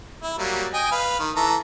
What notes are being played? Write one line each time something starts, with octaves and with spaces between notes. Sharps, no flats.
E4
F#3 G3 A#3
D#5 G5 G#5
B4 F5
D#3
E3 A4 A#5